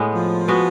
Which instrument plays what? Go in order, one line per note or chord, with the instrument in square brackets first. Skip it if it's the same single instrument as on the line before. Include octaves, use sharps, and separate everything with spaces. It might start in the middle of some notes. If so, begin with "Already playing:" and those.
Already playing: [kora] A2 G#3 B3
[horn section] F3
[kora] G#3 B3 F#4 B4